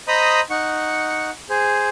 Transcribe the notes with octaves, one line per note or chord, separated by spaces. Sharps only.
C5 D#5 A#5 B5 D#6
D#4 F#5 C#6
G#4 C5